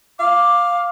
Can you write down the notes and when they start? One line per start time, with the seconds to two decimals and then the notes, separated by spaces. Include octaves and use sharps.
0.20 F5 D6